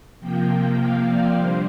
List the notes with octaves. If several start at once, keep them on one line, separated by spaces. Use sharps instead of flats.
C3 F3 A#3 G5
F5
D5
D3 G3 A#3 C5